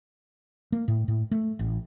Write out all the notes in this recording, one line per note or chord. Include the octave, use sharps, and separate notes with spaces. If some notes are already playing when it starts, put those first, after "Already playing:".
A#3
A2
A2
A3
A1